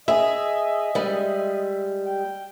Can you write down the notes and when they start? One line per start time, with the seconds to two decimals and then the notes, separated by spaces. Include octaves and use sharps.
0.08 G#4 D#5 E5
0.95 G3 G#3
2.05 G5